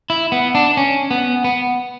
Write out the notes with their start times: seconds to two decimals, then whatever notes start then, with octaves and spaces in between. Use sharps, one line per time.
0.10 E4
0.32 B3
0.55 D4
0.77 C#4
1.11 B3
1.44 B3